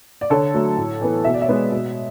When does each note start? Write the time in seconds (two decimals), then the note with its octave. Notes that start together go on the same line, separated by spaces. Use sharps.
0.21 D5
0.30 D3 A4 C#5
0.54 F#3 A3
0.77 A2
1.01 E3 B3
1.24 B2 E5
1.34 D5
1.42 C#5 E5
1.49 G#3 B3
1.72 B2